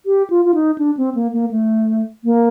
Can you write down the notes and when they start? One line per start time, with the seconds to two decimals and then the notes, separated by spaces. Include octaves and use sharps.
0.06 G4
0.30 F4
0.45 F4
0.54 D#4
0.78 D4
0.97 C4
1.15 A#3
1.33 A#3
1.51 A3
2.24 A#3